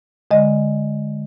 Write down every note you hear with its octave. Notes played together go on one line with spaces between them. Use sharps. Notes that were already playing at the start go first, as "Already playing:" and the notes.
D3 G#3 D#5